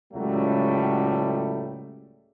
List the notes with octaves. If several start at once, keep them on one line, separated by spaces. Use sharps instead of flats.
C#2 A2 F#3 G3 A3